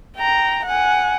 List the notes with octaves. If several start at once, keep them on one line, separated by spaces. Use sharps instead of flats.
G5 A#5
F#5 G#5